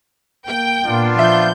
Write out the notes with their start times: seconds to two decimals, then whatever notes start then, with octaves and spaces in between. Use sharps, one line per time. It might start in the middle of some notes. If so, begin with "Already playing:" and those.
0.47 A#3 G5
0.86 A#2 A#3 B3 D4 F4
1.19 F3 E5 G6